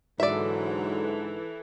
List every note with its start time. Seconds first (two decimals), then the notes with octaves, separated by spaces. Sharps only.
0.20 G#2 D3 E3 F#3 A4 D5 E5